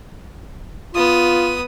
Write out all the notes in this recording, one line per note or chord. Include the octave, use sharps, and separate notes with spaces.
B3 F4 D#6